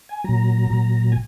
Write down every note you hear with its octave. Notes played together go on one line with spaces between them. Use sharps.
G#5
A#2 F#3 A#5
A#2 F#3
G#5